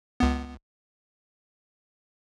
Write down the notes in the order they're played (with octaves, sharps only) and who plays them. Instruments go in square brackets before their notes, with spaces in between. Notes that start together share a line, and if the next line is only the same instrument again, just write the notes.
[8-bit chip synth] C#2 B3